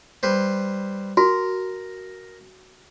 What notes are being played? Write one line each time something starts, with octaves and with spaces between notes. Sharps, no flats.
G3 B4 C5
F#4 A#4